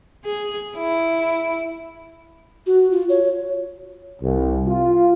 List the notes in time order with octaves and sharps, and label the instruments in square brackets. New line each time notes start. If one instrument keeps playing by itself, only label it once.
[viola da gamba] G#4
E4
[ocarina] F#4
F4
C#5
[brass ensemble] C2
F4